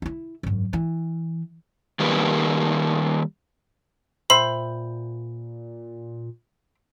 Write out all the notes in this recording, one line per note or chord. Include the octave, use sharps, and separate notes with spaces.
D#4 E4
G#1 F#2
E3
D#3 G3 A#3 B4
A#2 C5 E5 G5 B5